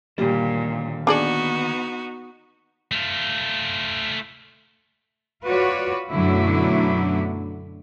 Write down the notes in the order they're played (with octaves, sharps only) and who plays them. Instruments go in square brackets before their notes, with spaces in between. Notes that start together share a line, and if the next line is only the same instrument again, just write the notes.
[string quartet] A#2 [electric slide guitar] D3 D#3 A#3 [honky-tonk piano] G3
[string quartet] B3 D#4 F#4 [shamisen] D4 G#4 D5
[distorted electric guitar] A3 F4
[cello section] F4 F#4 B4 C#5 D5
F#2 B2 D3 F#3 A3 E4